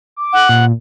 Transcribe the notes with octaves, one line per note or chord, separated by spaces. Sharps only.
D6
F#5
A#2